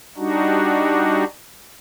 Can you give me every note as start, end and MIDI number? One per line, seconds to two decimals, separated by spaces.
0.17 1.24 55
0.17 1.24 62
0.17 1.24 63
0.17 1.24 66